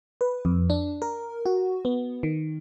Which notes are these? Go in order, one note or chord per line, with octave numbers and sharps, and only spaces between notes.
B4
F2
D4
A#4
F#4
B3
D#3